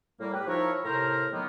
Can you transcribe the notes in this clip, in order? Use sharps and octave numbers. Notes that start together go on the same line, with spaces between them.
A2 G3 A#3
G4 B4
F3 D#4 E4 A#4 C#5
A2 C3 A#4 C5 A#5
D#3 F#3 A#3 B3